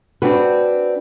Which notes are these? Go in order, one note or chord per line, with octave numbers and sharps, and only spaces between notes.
C4 D4 F#4 B4